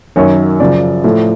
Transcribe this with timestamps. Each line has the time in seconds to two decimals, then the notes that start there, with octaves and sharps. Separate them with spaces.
0.16 F#2 D#3 F#3 C#5
0.60 F#2 C#3 F3 D5
1.04 A2 F3